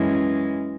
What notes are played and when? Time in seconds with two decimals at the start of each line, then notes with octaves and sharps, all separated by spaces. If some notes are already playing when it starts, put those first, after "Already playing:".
Already playing: F#2 E3 G#3 C#4